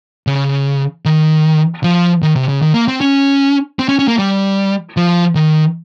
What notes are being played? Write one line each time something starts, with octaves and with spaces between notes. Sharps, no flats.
C#3
D#3
F3
D#3
C3
C#3
D#3
A#3
C4
C#4
C4
C#4
C#4
A#3
G3
F3
D#3